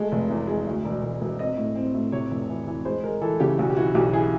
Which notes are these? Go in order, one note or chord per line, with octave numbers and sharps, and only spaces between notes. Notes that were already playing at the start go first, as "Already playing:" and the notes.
Already playing: G#3 A3
F1
E2
G#3
D2
E1
E1
E1
C4 D#5
A2
C4
A2
C3 C#5
F1
E3
E3
G#3 C5
G#3 A#4
E3 A4
C#3 G4
B1 F#4
G4
E3 F#4
B1 G4
E3 G#4